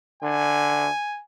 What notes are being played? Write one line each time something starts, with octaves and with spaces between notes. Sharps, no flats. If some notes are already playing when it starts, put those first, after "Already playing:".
D3 G#5